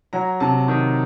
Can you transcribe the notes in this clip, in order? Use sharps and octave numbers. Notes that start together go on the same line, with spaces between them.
F#3 A#5
C3 A5
D#3